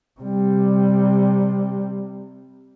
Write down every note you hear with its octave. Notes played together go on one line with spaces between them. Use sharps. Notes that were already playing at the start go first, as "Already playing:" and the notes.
C3 G3